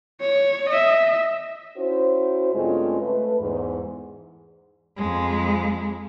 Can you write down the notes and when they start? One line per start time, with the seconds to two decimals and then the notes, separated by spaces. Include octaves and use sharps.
0.22 C#5
0.69 D#5 E5
1.77 C#4 E4 F#4 C5
2.54 G2 C#3 G#3 A3 C4 F4
3.00 A3 B4
3.40 E2 G#2
4.97 F2 G#3